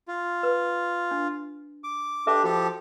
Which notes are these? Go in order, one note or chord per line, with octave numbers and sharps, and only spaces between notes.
F4
B4
D4
D6
D4 G4 A4 E5 D6
F3 F#4 G4 A4